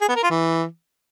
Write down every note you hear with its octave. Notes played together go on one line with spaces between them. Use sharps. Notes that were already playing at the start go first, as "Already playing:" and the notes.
G#4
B3
A#4
F4
E3